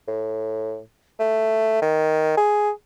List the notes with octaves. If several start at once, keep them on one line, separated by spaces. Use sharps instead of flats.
A2
A3
D#3
G#4